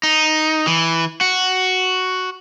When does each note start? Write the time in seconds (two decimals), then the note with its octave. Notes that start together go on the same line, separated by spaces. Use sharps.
0.03 D#4
0.67 E3
1.21 F#4